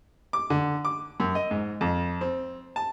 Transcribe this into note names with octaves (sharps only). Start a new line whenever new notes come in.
D6
D3
D6
F#2
D#5
G#2
F2
C4
A5